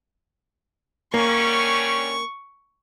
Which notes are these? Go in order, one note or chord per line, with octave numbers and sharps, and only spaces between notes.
D3 G3 A#3 C#4 C#6